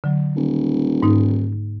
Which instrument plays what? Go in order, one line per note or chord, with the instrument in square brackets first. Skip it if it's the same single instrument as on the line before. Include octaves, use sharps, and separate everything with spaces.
[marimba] D3 F#3
[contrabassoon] D#1
[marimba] G#2 A#3 D#4